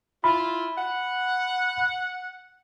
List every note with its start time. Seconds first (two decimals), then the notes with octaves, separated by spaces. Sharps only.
0.24 E4 F4 B5
0.77 F#5